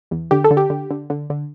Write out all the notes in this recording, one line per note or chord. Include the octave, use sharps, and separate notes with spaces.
E2
D3 G4
A4
D3
G4
D3
D3
D3
D3